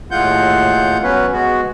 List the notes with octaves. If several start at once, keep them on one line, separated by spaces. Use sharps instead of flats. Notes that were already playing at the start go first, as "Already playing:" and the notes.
D#2 A2 G#3 F4 F#5 G6
F#3 B3 C#4 B4
G#3 B3 F#4